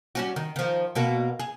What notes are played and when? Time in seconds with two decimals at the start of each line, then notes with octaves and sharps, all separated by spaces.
0.15 G3 C#4 F#4
0.36 D#3
0.56 D#3 F3
0.95 B2 A#3 F#4
1.40 G#4